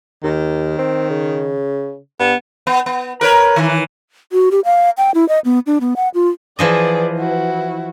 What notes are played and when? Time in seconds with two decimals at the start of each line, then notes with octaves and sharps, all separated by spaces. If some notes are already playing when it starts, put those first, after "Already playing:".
0.24 D#2 D#3
0.78 C4
1.10 C#3
2.20 G2 B3
2.67 B3
2.86 B3
3.21 A#4 B4 C#5
3.56 D#3 E3
4.32 F#4
4.51 G4
4.65 F5
4.98 G5
5.14 E4
5.29 D#5
5.45 B3
5.67 D4
5.81 B3
5.96 F#5
6.14 F4
6.59 E3 F3 G#4 D5 D#5
7.18 E4 F#4